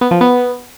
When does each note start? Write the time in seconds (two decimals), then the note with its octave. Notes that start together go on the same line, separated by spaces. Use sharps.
0.01 B3
0.11 F3
0.21 B3